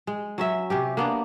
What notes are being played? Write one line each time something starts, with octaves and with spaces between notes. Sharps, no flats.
G#3
F#3 C#4 E5
C3 C#4 G4
A#3 B3 D4